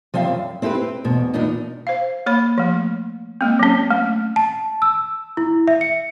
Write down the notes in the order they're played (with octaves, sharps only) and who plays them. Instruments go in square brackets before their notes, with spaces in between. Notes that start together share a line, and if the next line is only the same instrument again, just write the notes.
[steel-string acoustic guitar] F3 G3 C4 E5 F5
F#2
C4 E4 G4 A#4 B4
C4
E2 G#2 B2
E2 A#2 B3 D4 D#4
[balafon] C5 F5
A#3 C#5 B5
F3 A3
G#3 A#3 C4
F#3 C#4
A3
[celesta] A5
E6
E4
E5
C#7